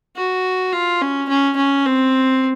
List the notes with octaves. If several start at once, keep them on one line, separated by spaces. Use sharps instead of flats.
F#4
F4
C#4
C#4
C#4
C4